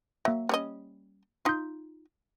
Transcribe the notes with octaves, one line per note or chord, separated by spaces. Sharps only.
F#3 A#3 E5
G3 C#4 D#5
D#4 F4 C6 G6